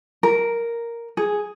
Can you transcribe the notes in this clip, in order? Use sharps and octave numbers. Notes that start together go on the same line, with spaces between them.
A#4
G#4